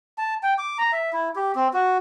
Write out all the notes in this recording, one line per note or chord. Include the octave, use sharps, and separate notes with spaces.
A5
G5
D6
A#5
E5
E4
G4
C4
F#4